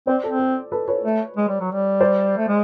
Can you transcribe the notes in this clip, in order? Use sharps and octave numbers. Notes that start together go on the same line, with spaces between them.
C4 C5 D5
C4 A4
A4
A4 B4
B4 C#5
A3
G#3
G3
F#3
G3
C5 D5
A3
G#3